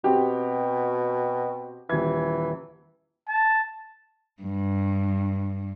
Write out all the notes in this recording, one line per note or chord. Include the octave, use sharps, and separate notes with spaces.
B2 C4 F#4 G4
D#1 E3 G#6
A5
G2